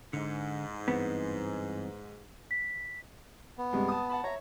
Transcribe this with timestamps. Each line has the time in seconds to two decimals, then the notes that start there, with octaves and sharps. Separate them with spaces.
0.13 G#2 D3
0.88 G2 E3 B3 C4
2.51 B6
3.58 B3
3.73 G2 C3 G#3
3.88 A5 D#6
4.10 F#5 A5 B5
4.24 C#5 E5 A#5